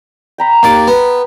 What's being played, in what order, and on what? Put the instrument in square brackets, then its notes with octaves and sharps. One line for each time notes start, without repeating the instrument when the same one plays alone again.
[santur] G5 A#5 B5
[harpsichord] D#2 D5 D6
B3